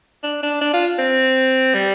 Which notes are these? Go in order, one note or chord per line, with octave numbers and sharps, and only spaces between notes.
D4
D4
D4
F4
C4
G3